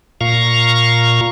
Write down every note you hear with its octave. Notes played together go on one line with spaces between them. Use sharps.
A#2 F5 A#5 C#6